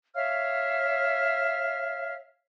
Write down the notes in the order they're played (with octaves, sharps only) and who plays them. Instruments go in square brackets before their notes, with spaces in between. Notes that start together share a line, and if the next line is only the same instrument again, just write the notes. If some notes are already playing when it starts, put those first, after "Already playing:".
[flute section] C#5 E5 F5 F6